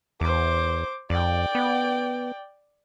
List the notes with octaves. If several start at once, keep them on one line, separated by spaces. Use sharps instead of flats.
E2 C5 D6
F2 D5 G5
B3